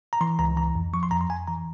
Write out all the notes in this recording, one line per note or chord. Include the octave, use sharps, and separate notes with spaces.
A#5
E3 C6
C#2 A#5
E3 A#5
F2
F3 C#6
C6
F2 A#5
C6
F2 G#5
E3 A#5